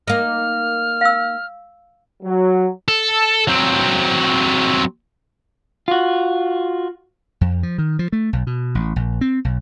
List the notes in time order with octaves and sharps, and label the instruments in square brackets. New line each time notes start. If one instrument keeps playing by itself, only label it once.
[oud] A#3 D#4 [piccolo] F6
[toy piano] F5 E6
[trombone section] F#3
[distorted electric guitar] A4
F#3 C4
[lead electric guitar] F4 F#4
[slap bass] F2
F3
D#3
F3
A3
B1
B2
A1
A#1
C4
B1